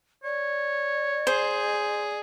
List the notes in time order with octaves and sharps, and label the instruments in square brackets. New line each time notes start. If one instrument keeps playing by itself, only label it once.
[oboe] C#5 [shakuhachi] D5
[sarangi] G#4 [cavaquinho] C5